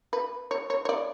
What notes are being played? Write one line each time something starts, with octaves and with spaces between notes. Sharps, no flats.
B4
C#5
C#5
C#5
D5